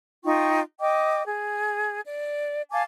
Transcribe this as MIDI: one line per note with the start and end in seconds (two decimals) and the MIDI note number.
0.25 0.60 63
0.25 0.60 65
0.25 0.60 79
0.25 0.60 85
0.80 1.22 75
0.80 1.22 79
0.80 1.22 86
1.27 2.01 68
2.06 2.61 74
2.71 2.82 77
2.71 2.82 80
2.71 2.82 81
2.71 2.82 86